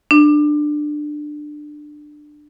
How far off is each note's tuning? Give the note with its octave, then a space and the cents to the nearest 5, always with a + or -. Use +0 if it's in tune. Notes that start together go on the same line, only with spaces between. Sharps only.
D4 +20